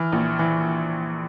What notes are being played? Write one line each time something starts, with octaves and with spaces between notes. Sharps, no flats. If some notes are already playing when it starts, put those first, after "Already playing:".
Already playing: E3 F6
A#1
E3